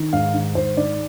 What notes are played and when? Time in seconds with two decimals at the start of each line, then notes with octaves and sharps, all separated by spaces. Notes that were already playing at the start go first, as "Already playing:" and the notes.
Already playing: D#3
0.13 G#2 F5
0.35 D#3
0.55 G#2 C5
0.77 D#3 D5